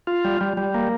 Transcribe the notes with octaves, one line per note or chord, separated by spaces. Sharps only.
F4
G3
G3
G3
A#3